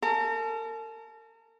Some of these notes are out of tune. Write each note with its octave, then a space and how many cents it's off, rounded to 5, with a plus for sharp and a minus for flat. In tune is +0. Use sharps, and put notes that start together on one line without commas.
A#4 -40 A5 -35